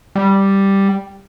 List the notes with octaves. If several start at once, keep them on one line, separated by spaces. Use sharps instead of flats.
G3